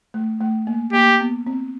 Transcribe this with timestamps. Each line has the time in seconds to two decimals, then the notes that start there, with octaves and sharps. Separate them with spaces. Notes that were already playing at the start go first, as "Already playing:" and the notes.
0.14 A3
0.41 A3
0.67 A#3
0.93 A#3 G4
1.20 B3
1.47 C4